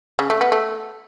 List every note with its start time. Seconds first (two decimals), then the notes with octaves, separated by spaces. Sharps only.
0.19 C#3
0.30 A3
0.41 B3
0.52 A3